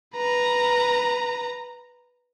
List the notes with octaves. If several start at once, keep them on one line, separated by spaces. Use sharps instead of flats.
B4 A#5